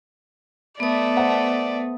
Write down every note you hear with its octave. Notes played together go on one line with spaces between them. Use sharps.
A3 B3 B4 D5 D#6
C5 F#5 A5